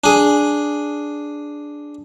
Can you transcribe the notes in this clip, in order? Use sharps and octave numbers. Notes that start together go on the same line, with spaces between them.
D4 G#4